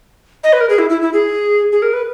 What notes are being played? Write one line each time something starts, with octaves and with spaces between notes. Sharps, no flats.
D#5
B4
A#4
G#4
E4
E4
E4
G#4
G#4
A#4
B4